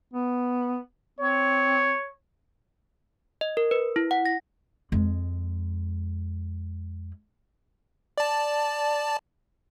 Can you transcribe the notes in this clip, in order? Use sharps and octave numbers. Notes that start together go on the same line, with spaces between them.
B3
C4 C#5
D#5
A#4
B4
E4
F#5
A#6
F2 G#3
D5 A5